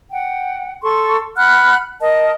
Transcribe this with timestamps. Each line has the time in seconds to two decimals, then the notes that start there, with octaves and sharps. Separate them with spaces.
0.11 F#5 G5
0.83 A4 C6 C#6
1.37 F#5 B5 F6 F#6
2.01 A#4 D#5 A5